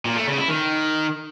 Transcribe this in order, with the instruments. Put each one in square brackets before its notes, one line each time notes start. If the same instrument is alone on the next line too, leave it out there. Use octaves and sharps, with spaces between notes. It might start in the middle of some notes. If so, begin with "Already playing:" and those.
[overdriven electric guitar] A#2
A3
C#3
E4
D#3